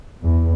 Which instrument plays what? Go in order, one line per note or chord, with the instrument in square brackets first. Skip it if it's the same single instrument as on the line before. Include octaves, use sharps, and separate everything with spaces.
[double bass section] E2